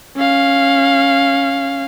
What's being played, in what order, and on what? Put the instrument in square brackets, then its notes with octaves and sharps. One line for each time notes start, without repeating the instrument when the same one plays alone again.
[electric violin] C#4 F5